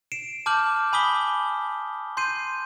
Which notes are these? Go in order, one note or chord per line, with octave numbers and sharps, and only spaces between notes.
C7 D7 E7
A5 D6 F6 G6 F#7
G#5 B5 D6 D#6 B6 G7
C6 G6 C7 D#7